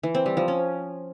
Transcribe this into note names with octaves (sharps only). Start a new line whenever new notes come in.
E3
C4
G3
F3
C#4